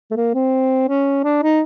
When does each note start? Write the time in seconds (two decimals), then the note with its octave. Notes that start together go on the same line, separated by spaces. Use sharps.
0.11 A3
0.16 A#3
0.34 C4
0.88 C#4
1.24 D4
1.43 D#4